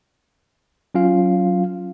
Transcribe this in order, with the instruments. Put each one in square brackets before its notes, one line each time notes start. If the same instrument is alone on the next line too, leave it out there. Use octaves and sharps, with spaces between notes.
[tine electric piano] F#3 C#4 F4 F5